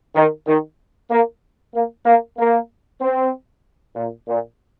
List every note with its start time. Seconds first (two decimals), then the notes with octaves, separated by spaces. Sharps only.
0.16 D#3
0.47 D#3
1.11 A#3
1.74 A#3
2.06 A#3
2.38 A#3
3.01 C4
3.96 A#2
4.28 A#2